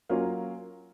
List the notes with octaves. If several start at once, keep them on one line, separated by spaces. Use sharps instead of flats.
F#3 A#3 C#4 F4